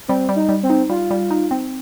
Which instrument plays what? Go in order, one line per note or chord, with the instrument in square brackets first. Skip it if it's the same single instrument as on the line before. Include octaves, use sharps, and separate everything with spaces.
[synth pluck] G3 [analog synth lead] C4
[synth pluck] G3
[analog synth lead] D#4
[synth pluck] G3
[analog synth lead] C4
[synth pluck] D#4
[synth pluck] G3 [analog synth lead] F4
[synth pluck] G3
D#4
C4